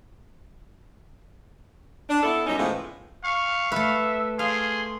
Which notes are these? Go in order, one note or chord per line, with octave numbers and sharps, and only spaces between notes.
D4
B3 E4 A4
F#2 B2 G3 C#4 D#4
A2 C#3 E3 F3 G#3 B3
F5 C#6
A3 B4 E5
G#4 F5 C6